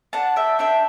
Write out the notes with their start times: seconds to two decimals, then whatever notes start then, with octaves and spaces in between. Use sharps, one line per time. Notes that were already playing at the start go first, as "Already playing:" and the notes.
0.13 D4 F#5 A5
0.36 E5 G5
0.59 D4 E5 G5